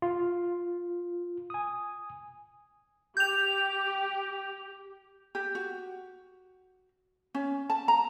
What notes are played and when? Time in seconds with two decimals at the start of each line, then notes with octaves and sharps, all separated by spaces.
0.02 F4
1.50 G#5 D#6
3.17 G4 G6 F7
5.35 G4
5.55 F#4
7.35 C#4
7.70 A5
7.88 A#5